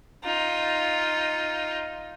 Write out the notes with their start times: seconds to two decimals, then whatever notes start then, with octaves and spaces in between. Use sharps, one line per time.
0.24 D#4 F4